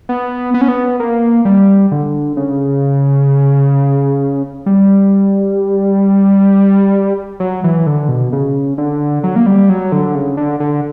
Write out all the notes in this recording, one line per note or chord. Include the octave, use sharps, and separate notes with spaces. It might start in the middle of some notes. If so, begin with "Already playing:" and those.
B3
B3
C#4
B3
A#3
G3
D3
C#3
G3
F#3
E3
D3
B2
C#3
D3
F#3
A#3
G3
F#3
D3
C#3
D3
D3